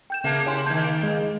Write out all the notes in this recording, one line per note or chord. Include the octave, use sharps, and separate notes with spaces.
G5 G6 E7
C#3 A#3 B3 A#4 E5 A5
E4 G4 C#5 G#5 C6
D#3 A#3 A5 G6 G#6
D7
G#3